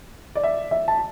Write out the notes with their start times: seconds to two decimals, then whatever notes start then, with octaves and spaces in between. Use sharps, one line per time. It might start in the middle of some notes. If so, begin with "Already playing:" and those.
0.35 D5
0.43 E5
0.71 E5
0.88 A5